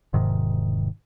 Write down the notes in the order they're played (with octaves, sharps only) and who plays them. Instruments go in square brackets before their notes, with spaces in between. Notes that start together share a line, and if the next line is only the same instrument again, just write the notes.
[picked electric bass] E1 G#2 C3 D#3